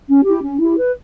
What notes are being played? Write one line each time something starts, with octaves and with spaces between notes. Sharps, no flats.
C#4
E4 G4
C#4
E4 G4
B4